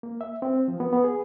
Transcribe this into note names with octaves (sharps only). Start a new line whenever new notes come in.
A#3
E5
C4
F3
B3
B3
G#4